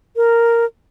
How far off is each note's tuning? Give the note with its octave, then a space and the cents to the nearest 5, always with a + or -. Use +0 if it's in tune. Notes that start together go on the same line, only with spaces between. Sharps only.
A#4 -5